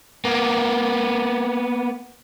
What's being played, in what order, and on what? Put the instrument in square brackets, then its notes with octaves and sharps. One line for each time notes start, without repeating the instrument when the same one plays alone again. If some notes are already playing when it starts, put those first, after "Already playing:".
[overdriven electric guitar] A#3 B3